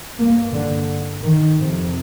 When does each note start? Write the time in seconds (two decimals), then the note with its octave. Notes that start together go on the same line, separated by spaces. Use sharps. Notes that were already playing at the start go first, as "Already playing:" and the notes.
0.18 G2 A#3
0.52 D3
1.22 D#3
1.57 F2 C3